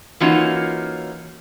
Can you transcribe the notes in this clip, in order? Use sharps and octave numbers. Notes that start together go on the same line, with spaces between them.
E3 A#3 C#4 D#4 F4 F#4